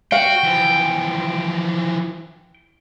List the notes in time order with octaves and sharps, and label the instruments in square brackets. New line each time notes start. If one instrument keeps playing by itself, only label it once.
[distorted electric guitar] F#4 [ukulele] F5 [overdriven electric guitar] G5
[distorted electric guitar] E3 F3